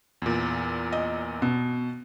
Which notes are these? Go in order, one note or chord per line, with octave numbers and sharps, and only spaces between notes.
E2 A#2
D#5
B2